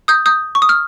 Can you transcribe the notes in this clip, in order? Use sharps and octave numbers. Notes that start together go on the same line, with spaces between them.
D#6 G6
D#6 G6
C#6
D#6
F6